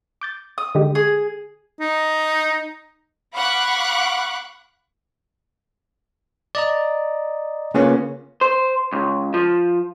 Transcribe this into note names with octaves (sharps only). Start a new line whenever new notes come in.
D6 G6 A6
D#6
D3 G#3 G4
G#4
D#4
F5 F#5 B5 C#6 D6 F#6
D5 D#5 A#5
C#3 A#3 B3 C#4 F4
C5
C#2
F3